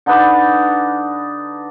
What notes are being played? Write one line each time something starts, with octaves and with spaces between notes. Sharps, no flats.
D3 D#4 B4 D5